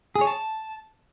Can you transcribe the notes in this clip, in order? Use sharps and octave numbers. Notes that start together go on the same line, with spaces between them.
G#4
C#5
A5